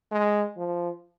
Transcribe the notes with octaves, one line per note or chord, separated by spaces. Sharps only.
G#3
F3